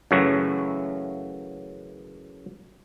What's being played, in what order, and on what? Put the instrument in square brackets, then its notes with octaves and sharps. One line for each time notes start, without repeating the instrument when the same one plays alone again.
[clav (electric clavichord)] F#2 C#3 E3 F#3 A3 F#4